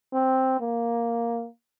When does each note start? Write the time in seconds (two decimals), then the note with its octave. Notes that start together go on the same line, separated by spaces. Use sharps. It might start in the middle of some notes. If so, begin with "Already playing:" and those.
0.13 C4
0.61 A#3